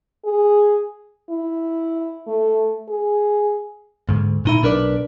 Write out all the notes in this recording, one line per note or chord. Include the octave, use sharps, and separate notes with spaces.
G#4
E4
A3
G#4
D2 G#2
A#2 D#4 E4
B1 D4 A#4 B4 D5